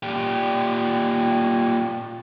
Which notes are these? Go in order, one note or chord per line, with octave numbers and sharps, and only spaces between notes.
A#2 G4